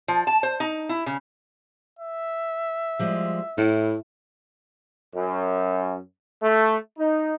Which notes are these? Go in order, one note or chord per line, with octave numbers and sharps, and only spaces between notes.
F3
A5
C5
D#4
E4
C#3
E5
F3 G3 G#3
A2 E4
F#2
A3
D#4